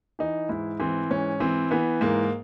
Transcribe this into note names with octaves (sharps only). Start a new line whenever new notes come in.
E3 D#4
G#2 E4
E3 C4
G#2 C#4
E3 C4
E3 B3
G#2 A#3